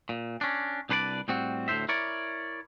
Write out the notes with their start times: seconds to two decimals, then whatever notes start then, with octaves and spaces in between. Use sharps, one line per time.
0.09 A#2
0.41 C#4 D4
0.89 C2 D4 B4 C5 D5
1.28 A2 G3 C4 F#4
1.68 D2 A2 D#3 C5 E5
1.89 E4 A#4 C#5 D5